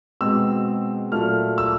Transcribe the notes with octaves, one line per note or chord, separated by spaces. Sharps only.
B2 G#3 C4 E6
A#2 F#3 A3 F6
E6